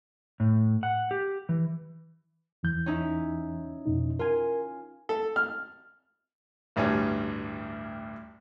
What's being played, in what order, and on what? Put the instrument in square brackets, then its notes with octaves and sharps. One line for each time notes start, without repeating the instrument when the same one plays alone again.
[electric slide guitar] A2
F#5
G4
E3
[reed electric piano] E2 E3 G6
[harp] C#4 D#4 E4
[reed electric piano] F2 B2 D#4
[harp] F4 G#5 [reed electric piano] A#4
[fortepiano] A4
F6
A1 D2 G2 G3 C#5 G#5